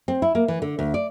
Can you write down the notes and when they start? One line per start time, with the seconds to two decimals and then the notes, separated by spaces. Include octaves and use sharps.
0.08 C4
0.22 E4
0.35 A#3
0.48 E3
0.62 D3
0.79 D2
0.94 D5